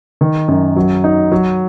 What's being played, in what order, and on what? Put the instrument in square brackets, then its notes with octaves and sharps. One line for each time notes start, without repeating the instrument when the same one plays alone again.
[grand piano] D#3
F#2
F#3
D#4
F#3